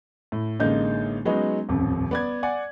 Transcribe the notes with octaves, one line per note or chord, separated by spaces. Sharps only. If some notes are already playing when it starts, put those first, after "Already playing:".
A2
A1 D3 G#3 A#3 D#4 G6
F#3 G#3 B3 C#4 D#4
D#1 A1 F2
B3 D5 G#6
D5 F#5 G#5